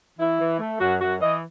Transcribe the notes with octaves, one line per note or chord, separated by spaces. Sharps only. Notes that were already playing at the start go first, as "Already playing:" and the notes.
E3 E4
E3
A3
F#2 F#4
F#2 F#4
E3 D#5